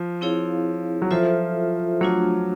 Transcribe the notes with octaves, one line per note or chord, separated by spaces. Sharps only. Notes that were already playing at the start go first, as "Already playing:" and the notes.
Already playing: F3
C4 E4 G#4 C#5 F5
F#3
F3 F4 A4 C5 E5
F#3 A3 D4 F4